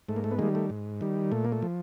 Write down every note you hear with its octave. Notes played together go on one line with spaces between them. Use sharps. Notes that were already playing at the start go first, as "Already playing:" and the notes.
G#2 A3
A#3
A3
B3
D#3 G3 G#3 A#3
A3
G#2
D#3 G3
A#2 A3
A#3
A3
F3